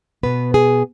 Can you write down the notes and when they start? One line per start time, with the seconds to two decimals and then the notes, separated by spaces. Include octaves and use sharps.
0.23 B2 B3 B4
0.54 G#4